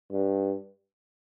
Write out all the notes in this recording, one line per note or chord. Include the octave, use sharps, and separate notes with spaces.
G2